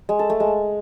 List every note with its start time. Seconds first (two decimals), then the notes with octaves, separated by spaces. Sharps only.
0.09 G#3
0.19 A4
0.30 A3
0.40 G#3